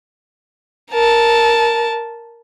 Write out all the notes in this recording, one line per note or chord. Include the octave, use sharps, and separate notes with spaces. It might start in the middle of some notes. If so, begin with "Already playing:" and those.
A#4 A5